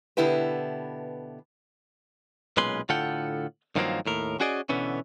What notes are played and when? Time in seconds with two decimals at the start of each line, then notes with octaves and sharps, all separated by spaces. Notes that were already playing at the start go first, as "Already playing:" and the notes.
0.17 B2 D3 B3 E4 G4 B4
2.57 B1 A#2 G#3 C#4 B4 C6
2.89 A2 D3 F4 A4 F#5 G5
3.76 G2 D#3 F3 F#3 A#3 C4
4.06 D#2 A2 A#4
4.40 C#4 F#4 G#4 D5 D#5
4.69 B2 D3 E3 B3 C#4